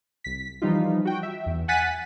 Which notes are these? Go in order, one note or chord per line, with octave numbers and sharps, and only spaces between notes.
C2 B6
E3 F3 G3 D#4 F4
F#4 G5
E5
E2
F#5 G#5 F#6 A6 B6 D#7